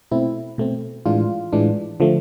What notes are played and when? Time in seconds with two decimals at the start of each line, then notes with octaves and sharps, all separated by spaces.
0.11 B2 A3 C4 E4
0.58 B2 A3 C4
1.06 A2 E3 G#3 D4 F4
1.53 A2 E3 G#3 D4
2.00 D3 F3 A3